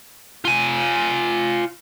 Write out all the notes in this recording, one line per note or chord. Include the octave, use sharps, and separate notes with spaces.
F4 G#5